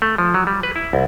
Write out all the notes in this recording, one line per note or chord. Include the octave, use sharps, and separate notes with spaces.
A3
F3
F#3
G3
B4
E4
C2